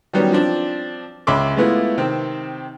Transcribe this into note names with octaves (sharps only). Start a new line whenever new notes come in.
D#3 F#3 G3 B3 C#4
F3 C4 D4
C#2 C#4 E5 B5 C6 D6
G#3 A3 B3 E4 F4
C3 D#3 C4